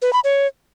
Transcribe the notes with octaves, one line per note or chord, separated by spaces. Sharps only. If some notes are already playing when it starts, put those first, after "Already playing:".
B4
B5
C#5